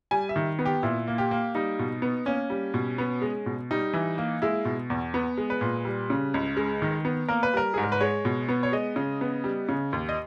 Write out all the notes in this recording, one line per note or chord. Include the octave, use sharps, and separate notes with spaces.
G3 G#5
E5
D#3
B3
G4
A#2 E4
A#3
G4
A#3
G3 D#4
B2
B3
A#3 C#4
G3
B2
B3
G#3
B2
G3 D#4
E3
A#3
G#3 E4
B2
E2
B3
G#3
B4
A#2
G3
C#3
C#2
G#3
D#3
B3
A#3 A#4
B4
G3 A#4
G#2 G#4
A#4
B4
G#3 C#5
B2
B3
C#5
G#3 D#5
C#3
B3
G3
C#3
D#2
D#5